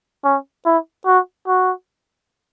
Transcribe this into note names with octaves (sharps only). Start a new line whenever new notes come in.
C#4
E4
F#4
F#4